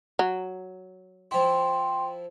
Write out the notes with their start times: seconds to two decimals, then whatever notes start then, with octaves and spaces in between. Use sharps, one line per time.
0.19 F#3
1.31 F3 E4 G5 C6